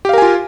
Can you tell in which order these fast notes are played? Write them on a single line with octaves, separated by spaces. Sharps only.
G4 F5 A#4 G#5 F4